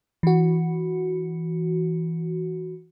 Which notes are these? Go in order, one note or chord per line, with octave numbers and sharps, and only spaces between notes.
E3 F#4